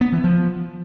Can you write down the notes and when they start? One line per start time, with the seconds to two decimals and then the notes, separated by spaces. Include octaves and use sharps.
0.01 B3
0.12 E3
0.24 F3